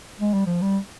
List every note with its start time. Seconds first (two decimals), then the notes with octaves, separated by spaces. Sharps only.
0.20 G#3
0.33 G3
0.47 F3
0.61 G3